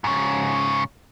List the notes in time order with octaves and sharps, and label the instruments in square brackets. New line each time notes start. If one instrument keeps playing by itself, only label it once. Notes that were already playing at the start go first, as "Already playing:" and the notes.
[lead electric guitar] G#2 C#3